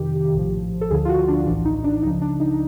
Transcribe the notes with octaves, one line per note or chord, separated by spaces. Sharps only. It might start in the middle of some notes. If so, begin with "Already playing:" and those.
Already playing: F2 C3 D#3 G4
A#1 A2 F3
A4
D2 D3 F3 G#4
F4
F#4
D4
A#1 A2 E3 D4
D#4
D4
C#2 C#3 F3 D#4
D4
D#4